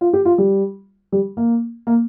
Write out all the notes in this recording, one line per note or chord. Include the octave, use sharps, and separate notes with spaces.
F4
G4
F4
G3
G3
A#3
A#3